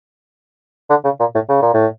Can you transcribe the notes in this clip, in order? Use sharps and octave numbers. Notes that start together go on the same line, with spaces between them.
D3
C#3
A#2
A2
C#3
A#2
A2